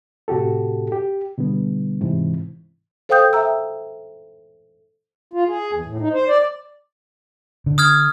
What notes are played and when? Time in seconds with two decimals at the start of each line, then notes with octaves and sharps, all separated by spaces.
0.28 A2 C3 F#4 G4 A4
0.92 G4
1.38 B2 D3 G3 B3
2.01 G#2 C3 E3
3.09 A4 C5 F5 G5 D#6 G6
3.33 E5 G5 A#5 E6
5.33 F4
5.47 G#4
5.73 E2
5.86 A2
6.00 D#4
6.13 C5
6.28 D5
7.66 D3
7.78 D#6 F6 G#6